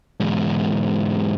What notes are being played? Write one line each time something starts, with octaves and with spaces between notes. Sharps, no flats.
E2 G#2